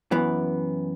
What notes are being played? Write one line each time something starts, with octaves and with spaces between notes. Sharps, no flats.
F#2 E3 B3